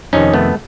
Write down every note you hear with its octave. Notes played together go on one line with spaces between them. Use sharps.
F2 C3 D#3 C#4 D#4
A3 B3